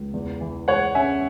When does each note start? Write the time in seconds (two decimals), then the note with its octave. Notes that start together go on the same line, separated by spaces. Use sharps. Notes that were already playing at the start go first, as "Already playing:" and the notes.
Already playing: C#2
0.14 E2
0.41 E3
0.68 G#3 C#5 F#5
0.95 C#4 E5 G#5